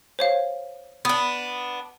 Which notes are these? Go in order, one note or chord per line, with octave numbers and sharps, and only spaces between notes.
C5 C#5 F5
B3 D4